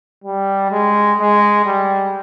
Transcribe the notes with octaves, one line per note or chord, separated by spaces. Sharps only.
G3
G#3
G#3
G3